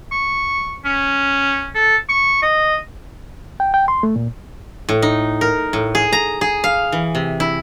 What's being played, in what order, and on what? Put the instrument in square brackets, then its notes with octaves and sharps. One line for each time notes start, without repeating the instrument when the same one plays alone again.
[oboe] C#6
C#4
A4
C#6
D#5
[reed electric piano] G5
G5
C6
A3
A#2
[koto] A2
D#4
A#4
A2
G#4
A#5
G#4
F5
E3
C3
E4